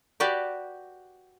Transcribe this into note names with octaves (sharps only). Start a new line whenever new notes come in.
F#4 G4 B4 D5